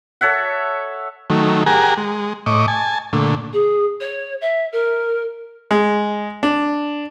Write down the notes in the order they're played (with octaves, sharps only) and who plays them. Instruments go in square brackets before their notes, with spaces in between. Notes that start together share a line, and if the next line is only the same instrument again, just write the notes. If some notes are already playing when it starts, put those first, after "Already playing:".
[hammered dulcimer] A4 C#5 E5 F#5
[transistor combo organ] D#3 F#3 A3
G4 G#4 A#4 F#5 G#5 A#5
G#3
A2 D#5 C#6 D6
G#5 A5
A#2 D3 A3
[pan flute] G#4
C#5
E5
A#4
[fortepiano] G#3
D4